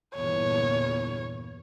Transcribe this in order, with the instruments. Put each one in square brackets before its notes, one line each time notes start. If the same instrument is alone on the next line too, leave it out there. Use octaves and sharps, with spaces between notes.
[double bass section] G1 E2 A#2 [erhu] C#5